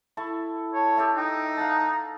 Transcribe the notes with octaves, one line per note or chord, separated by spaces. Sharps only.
E4 A4 C#6
C#5 A5
G4 A4 E5
D#4 G5
F5 F#5 A5 A#5